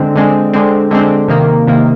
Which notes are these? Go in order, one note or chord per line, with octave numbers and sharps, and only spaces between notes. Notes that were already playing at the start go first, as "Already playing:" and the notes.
Already playing: D3 G#3 C4
D3 G#3 C4
D3 G#3 C4
D3 G#3 C4
C3 D#3 A#3
C3 D#3 A#3